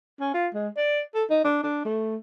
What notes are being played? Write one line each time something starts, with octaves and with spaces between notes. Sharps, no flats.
C#4
F4
G#3
D5
A4
D#4
D4
D4
A3